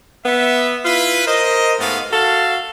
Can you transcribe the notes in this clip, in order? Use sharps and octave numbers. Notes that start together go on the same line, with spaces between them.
B3 E5
E4 F4 B4
A#4 C5 D#5
G#2 A3 B3 F5
F#4 A4 F5